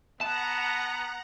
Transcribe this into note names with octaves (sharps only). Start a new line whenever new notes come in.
B3 F#5 A5 A#5